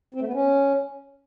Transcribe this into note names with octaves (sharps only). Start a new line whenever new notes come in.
C4
A3
B3
C#4